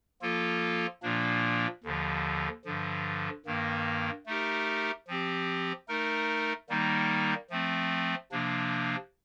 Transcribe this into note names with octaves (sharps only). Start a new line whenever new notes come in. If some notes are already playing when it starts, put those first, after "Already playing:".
F3 A#3 F4 A4
A#2 F3 A#3 D4
D#2 D3 F3
G2 D3 F3
G2 D#3 A#3
A3 D#4 G4 A#4
F3 C4 G4
A3 D#4 A#4
D#3 G3 A#3 D#4
F3 A3 C4
C3 F3 A#3 D4